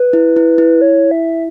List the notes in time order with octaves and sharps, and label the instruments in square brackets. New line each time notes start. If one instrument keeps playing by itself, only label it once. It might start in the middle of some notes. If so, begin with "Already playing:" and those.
Already playing: [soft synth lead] B4
[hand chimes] E4
E4
E4
[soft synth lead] C#5
E5